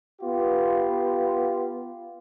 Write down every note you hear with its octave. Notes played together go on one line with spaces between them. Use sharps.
B3 F4 G4